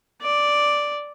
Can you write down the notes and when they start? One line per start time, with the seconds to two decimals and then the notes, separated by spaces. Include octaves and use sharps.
0.22 D5